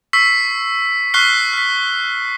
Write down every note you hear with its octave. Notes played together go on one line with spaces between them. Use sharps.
C#6 E6 B6 C7
C#6 F6 F#6 B6 C7 G7
F6 B6